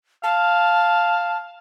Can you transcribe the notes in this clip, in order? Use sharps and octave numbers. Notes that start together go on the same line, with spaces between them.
F5 A5